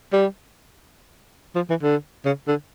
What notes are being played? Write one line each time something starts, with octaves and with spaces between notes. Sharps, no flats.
G3
F3
E3
D3
C#3
D3